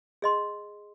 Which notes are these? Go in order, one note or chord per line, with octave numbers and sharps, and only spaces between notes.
G#4 D#5 C6